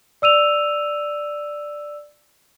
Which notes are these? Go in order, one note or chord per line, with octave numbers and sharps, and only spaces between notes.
D5 E6 D#7 F7